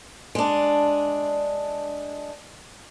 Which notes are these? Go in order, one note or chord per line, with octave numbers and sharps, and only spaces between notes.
G#3 D4